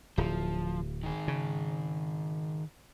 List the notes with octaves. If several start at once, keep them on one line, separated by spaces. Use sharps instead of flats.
D1 F3
D#3 G#4
C#3